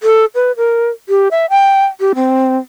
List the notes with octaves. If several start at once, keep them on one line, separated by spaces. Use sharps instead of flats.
A4
B4
A#4
G4
E5
G5
G4
C4